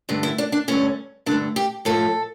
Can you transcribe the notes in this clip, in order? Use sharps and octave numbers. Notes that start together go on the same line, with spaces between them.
G2 D3 A3
E4
D4
D4
G2 D3 A3 C#4
G2 D3 A3 D4
G4
A2 F3 A3 A4